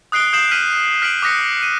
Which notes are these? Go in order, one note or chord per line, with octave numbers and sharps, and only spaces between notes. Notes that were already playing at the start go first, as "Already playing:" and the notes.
D#6 F#6 C7 D7 G7
D#6 G6 C7 E7 F#7
F6 B6 D7 D#7 F#7
F6 B6 D7 F#7
D6 D#6 F#6 A#6 B6 C#7
D#7